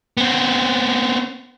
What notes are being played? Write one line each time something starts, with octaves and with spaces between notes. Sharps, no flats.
B3 C4